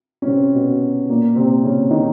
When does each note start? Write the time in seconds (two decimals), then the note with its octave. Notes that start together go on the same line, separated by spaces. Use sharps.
0.22 C#4
0.26 C3 C4
0.55 B2 B3
1.09 A#2 A#3
1.36 C3 C4
1.63 C#3 C#4
1.91 D#3 D#4